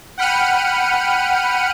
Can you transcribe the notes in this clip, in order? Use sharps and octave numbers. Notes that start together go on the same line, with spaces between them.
F#5 G5 B5 F6 C#7 D#7